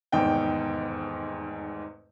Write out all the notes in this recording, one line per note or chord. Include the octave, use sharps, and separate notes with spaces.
F1 E2 G#2 D#3 D#4 G5